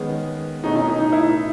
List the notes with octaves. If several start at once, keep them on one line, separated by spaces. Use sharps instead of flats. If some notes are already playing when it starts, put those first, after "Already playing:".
Already playing: D#3 G#3 B3 C#4 G#4
B2 A3 C#4 D#4 G#4
D#4
D#4
D#4
E4